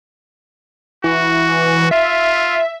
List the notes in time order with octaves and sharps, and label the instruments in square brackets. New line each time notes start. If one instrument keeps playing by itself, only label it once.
[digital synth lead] E3 [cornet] F#4
[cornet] F4 [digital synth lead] E5